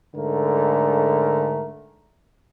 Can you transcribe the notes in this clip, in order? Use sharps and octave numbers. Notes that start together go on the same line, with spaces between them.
G#2 D3 A3 A#4